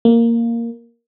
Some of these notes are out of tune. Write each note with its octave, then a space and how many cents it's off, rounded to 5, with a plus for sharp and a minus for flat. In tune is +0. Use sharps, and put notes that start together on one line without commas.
A#3 -5